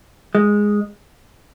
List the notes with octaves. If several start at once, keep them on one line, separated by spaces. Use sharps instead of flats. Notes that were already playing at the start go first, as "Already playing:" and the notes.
G#3